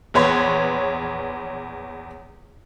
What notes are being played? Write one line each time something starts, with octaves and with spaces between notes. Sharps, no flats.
A#1 E2 B4 C#5 C6